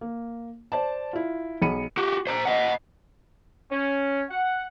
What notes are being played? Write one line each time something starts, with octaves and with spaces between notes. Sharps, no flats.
A#3
C5 D5 A5
E4 F4
B1 G#4 B5 C#7 D#7
F#4 G4
C5 A#5
D#5 F#5
C#4
F#5